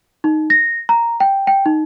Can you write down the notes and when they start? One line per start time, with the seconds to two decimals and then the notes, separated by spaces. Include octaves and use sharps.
0.24 D#4
0.50 A#6
0.89 A#5
1.20 G5
1.47 G5
1.66 D#4